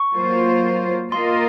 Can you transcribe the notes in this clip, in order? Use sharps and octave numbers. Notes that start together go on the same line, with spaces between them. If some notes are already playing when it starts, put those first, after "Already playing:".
Already playing: C#6
F#3 A#3 F4 C5
A#3 F4 A#4 D#5 C6